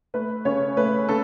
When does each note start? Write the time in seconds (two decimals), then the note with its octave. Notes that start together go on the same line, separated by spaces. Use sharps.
0.14 A3 B4
0.45 C#3 C#5
0.77 A3 B4
1.09 C#3 A4